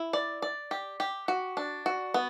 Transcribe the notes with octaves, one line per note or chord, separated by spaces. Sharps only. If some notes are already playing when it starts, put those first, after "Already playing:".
Already playing: E4
D5
D5
G4
G4
F#4
D4
F#4
B3